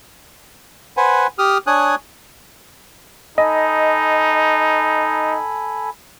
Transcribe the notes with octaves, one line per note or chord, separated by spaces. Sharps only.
B4 C5 F#5 G#5
G4 D#6 F6
D4 C#5 G#5 D#6 F#6
D#4 A4 D#5 G#5 B5